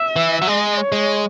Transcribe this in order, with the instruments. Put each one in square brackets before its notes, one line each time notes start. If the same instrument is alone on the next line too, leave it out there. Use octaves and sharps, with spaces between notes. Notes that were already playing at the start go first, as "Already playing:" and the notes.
Already playing: [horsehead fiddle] E5
[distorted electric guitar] E3
F#3
[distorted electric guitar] G#3 [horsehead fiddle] D#5
[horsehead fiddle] C#5
[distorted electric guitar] G#3